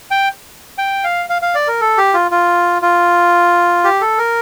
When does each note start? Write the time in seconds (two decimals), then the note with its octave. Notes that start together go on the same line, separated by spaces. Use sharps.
0.11 G5
0.78 G5
1.04 F5
1.29 F5
1.42 F5
1.55 D5
1.67 A#4
1.81 A4
1.98 G4
2.14 F4
2.31 F4
2.82 F4
3.84 G4
4.01 A4
4.18 A#4